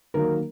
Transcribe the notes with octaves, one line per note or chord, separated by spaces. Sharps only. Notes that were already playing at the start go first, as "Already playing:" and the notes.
D#3 F#3 A#3 A#4